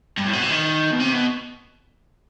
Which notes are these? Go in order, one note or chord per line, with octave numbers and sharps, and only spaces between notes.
G2
A2
B2
C3
D#3
B2
C3
B2